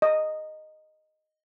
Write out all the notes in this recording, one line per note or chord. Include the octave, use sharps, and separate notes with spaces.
D#5